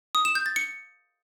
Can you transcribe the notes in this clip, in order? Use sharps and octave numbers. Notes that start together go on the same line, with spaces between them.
D#6
E7
G6
A6
C#7